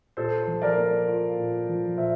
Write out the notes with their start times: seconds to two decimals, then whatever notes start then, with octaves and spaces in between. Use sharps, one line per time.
0.17 A#2 A4 C5
0.47 F3
0.62 A#4 D5
0.78 A#3
1.08 F4
1.38 A#2
1.68 F3
1.97 A#2 C5 E5